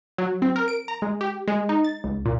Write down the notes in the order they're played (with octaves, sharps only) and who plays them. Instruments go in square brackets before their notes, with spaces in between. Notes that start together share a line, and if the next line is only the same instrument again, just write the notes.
[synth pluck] F#3
C4
A#4
D7
A#5
G#3
G4
G#3
D#4
A6
C#2
A#2